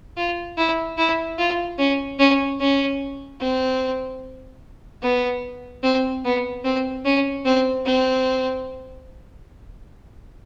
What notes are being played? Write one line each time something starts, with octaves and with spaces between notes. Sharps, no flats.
F4
E4
E4
F4
C#4
C#4
C#4
C4
B3
C4
B3
C4
C#4
C4
C4